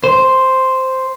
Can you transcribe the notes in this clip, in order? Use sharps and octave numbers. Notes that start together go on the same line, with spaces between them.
C5